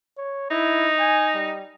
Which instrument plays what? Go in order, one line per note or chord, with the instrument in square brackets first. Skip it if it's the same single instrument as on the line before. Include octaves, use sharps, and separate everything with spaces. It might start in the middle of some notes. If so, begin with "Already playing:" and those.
[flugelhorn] C#5
[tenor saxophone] D#4 [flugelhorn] E4
[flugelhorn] G#5
G3